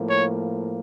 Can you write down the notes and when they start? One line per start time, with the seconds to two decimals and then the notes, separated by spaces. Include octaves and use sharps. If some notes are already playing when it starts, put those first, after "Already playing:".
Already playing: A2 F3 A#3
0.09 C#5